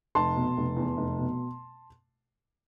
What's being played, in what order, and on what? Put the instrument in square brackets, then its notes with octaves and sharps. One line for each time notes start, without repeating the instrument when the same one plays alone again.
[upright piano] F1 A5 C6
B2
F1
E2
F1
B2